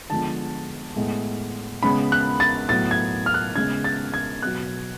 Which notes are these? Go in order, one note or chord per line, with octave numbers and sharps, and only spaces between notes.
D3 F3 G#3 B3 A5
A2 G#3 B3
C#3 G#3 B3 B5
F#6
A6
A2 F#3 B3 A6
G#6
F6
F#6
C#3 G#3 B3 G#6
A6
G#6
B2 F#3 B3 F#6